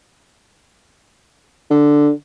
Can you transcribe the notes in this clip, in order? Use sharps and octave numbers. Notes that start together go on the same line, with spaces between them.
D3